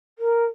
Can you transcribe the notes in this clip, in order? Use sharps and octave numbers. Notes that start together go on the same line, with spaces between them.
A#4